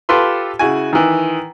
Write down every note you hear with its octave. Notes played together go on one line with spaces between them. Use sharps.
F4 G4 A4 B4 C6
C#3 E4 F#4 G#5
D#3 E3